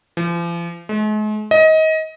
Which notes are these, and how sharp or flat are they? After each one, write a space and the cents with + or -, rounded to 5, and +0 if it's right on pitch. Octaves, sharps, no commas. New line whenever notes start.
F3 -40
G#3 +45
D#5 +25